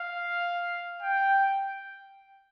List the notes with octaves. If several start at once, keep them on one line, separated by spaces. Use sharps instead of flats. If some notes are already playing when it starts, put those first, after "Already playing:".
Already playing: F5
G5